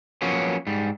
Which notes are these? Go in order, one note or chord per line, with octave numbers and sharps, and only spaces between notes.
F3 F#3 A#3 B3 C#4
G#2 G3